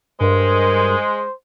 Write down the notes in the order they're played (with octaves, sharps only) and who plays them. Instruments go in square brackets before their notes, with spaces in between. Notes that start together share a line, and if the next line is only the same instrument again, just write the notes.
[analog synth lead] G2 [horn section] G#3 [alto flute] A#4 [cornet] C5